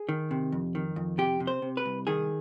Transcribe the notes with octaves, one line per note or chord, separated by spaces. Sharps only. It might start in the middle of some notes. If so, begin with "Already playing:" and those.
Already playing: G#4
D#3
C3
F2
D#3
F2
C3 G4
C3
C5
C3
B4
C2
D#3 G#4